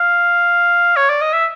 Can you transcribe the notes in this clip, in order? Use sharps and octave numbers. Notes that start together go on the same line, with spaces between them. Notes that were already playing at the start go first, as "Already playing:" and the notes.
Already playing: F5
C#5
D5
D#5
E5